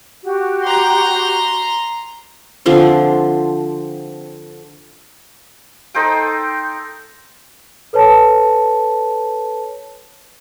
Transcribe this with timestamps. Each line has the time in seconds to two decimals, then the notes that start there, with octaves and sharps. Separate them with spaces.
0.24 F#4 G4
0.65 A#5 C6
2.66 D3 F3 C4
5.94 D#4 A4 C5 G5
7.93 A4 B4 C#5 A5